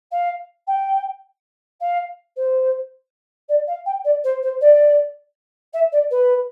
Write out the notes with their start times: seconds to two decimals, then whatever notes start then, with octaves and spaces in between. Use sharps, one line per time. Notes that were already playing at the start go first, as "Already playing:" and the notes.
0.11 F5
0.67 G5
1.80 F5
2.36 C5
3.49 D5
3.67 F5
3.86 G5
4.04 D5
4.24 C5
4.42 C5
4.61 D5
5.73 E5
5.92 D5
6.10 B4